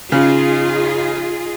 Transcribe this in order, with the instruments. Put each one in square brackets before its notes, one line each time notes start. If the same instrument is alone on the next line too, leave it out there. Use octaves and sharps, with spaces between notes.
[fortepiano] C#3 [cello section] D#4 F4 G#4